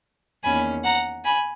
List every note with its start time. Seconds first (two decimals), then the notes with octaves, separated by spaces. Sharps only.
0.44 E2 D#3 A#3 C#4 G#5 B5
0.84 F#5 A#5
1.25 G#5 B5